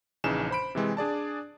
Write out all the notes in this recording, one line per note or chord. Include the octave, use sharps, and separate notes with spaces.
A#1 C#3 E3 C#4 D#4 E7
C5 B5 D7
C3 E3 G#3 C4
D4 G#4 D5 A5